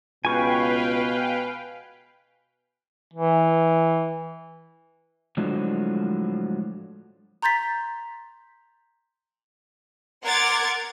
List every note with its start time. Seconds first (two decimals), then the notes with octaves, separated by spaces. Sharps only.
0.25 C#2 B2 B4 F5 G5 G#5 C#6
3.14 E3
5.37 A2 D3 F3 F#3 G#3
7.42 A#5 C6 G6 A6 B6
10.24 A#4 F#5 C6 D6 G#6 A6